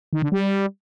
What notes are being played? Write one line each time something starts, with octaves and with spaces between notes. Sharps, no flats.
D#3
D3
G3